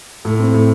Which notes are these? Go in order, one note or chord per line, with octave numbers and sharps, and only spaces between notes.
A2
C4
A2